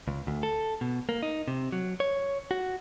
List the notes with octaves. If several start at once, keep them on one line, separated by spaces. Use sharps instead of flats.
C#2
D2
A4
B2
A#3
D#4
C3
F#3
C#5
F#4